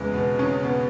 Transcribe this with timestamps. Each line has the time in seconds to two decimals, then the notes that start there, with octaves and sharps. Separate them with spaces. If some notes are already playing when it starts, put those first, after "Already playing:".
Already playing: E2 C#3 E3 G#3
0.14 B2 B3
0.39 C#3 C#4
0.63 B2 B3